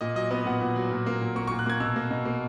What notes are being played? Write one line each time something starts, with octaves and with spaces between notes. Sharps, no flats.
A#2 D#5
F#3 D#5
B3 D#5
A#2 F#5
A#2
F#3
A#2
A#3
A#2
A#3 C#6
A#2 C#6
F#6
A#3 G#6
B2 E6
A#3
B2
A#3